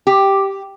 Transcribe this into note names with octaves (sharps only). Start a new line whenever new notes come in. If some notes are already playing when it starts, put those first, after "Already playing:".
G4